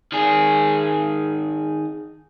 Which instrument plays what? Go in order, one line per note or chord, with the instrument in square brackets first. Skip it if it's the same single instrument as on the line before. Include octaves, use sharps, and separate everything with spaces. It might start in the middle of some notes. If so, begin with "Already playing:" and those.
[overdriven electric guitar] D#3 G#4